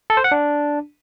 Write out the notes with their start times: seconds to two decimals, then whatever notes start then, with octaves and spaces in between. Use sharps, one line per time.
0.10 A4
0.17 C5
0.24 F#5
0.32 D4